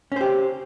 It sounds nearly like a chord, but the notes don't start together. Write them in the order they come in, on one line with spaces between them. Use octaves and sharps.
C#4 C5 G4